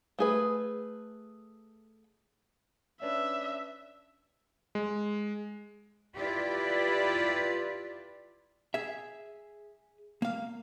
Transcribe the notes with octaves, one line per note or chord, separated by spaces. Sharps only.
A3 G#4 B4
C#4 D4 B4 E5
G#3
E4 F4 G4 B4 D5
G#4 E5
A#3 F5